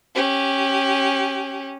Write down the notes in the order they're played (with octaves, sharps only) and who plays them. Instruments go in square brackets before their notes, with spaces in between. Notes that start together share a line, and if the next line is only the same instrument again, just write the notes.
[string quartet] C#4 G4